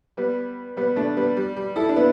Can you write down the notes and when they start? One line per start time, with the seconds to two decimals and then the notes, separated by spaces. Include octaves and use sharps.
0.17 G3 B3
0.77 G3 B3
0.96 A3 D4
1.17 G3 B3
1.36 G3
1.56 G3
1.76 E4 A4
1.89 D4
1.96 B3 E4